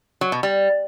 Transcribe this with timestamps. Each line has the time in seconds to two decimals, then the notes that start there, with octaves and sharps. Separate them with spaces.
0.21 F#3
0.32 B2
0.43 G3